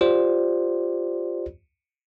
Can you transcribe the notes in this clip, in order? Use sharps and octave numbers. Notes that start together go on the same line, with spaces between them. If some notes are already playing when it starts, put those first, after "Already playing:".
F4 G4 C5 D5